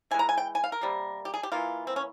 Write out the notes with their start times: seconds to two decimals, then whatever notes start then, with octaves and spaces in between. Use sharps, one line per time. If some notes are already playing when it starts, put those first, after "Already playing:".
0.11 E3 G#5
0.14 G#3 A#5
0.29 G#5
0.37 G5
0.55 G#5
0.64 F5
0.72 A#4
0.81 C3 G3 A#3
1.25 G4
1.34 G#4
1.43 G4
1.52 E3 A#3 F4
1.87 C4
1.96 C#4